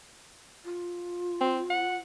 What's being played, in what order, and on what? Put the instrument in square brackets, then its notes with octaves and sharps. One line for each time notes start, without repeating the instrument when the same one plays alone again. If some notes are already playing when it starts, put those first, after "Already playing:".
[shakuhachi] F4
[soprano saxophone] C4
F#5